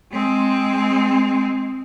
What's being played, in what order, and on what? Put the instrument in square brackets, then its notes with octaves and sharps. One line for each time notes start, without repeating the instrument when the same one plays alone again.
[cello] G#3 C4